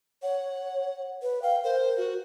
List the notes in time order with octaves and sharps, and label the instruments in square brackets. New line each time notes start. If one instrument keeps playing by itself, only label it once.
[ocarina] C#5 [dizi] F#5
[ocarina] B4
[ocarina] F5 [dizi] G5
[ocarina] A#4 [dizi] C5
[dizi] F#4